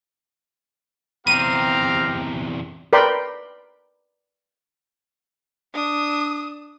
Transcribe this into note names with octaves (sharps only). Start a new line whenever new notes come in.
E2 C3 C4 G4 F5 A#5 D#7
A#4 B4 D5 G5 B5 C6
D4 D#6